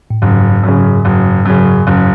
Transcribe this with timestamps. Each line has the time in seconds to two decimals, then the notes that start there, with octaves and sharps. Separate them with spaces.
0.10 A2
0.22 F#1 G#2
0.63 F#2 C#3
1.05 F#1
1.45 F#2 C#3
1.87 F#1